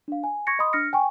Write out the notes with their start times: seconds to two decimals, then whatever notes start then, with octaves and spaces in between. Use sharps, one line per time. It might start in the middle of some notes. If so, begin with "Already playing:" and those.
0.08 D4 F5
0.24 G#5
0.47 C#6 G#6 A#6 C#7
0.59 D#5 B5 C6 D#6
0.73 D4 F6 A#6 C#7
0.93 G5 G#5 C#6